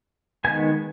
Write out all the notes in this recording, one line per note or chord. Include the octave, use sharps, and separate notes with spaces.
D#3 G#3 B3 G#5